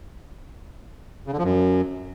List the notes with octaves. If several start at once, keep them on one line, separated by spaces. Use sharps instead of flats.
C#3
D3
F3
F#2